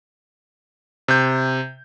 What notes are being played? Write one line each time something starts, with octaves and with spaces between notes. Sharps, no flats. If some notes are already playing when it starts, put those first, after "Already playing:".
C3 G6